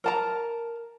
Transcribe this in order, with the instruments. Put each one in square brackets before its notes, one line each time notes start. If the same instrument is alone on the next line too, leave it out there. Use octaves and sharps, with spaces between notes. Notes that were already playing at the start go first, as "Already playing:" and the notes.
[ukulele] A#4 A5 A#5